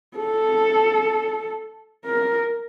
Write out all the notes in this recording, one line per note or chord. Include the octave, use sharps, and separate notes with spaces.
A4
A#4